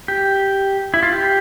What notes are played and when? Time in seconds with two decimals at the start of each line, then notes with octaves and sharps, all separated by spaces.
0.08 G4
0.94 E4
1.03 F4
1.12 G4